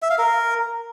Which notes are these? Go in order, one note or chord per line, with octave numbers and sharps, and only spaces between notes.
E5
F5
A#4